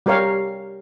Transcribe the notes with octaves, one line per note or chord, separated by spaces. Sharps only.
G3 G4 A#4 C#5 F5